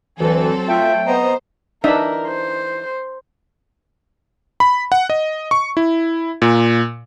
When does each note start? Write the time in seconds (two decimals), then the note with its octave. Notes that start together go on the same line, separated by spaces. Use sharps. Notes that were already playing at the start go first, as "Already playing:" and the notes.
0.19 D2 E3 F#3 C4 A4
0.69 A3 F4 E5 G5
1.07 B3 C5 D#5 A#5
1.84 E3 D4 D#4 A#4 E5
2.28 C5
4.60 B5
4.92 F#5
5.10 D#5
5.51 C#6
5.77 E4
6.42 A#2